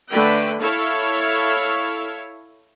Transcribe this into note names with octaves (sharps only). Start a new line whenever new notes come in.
D3 A3 B4 G5 B5
E4 A4 C#5 E5 F5